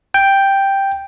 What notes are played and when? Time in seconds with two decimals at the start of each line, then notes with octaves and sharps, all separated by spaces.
0.14 G5